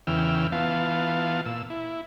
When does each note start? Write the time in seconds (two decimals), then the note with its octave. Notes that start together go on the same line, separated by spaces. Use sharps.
0.07 E2 C#3 E3 G5 E6 F6
0.52 E3 B3 F4 F5 A5
1.46 A#2 E6
1.70 E4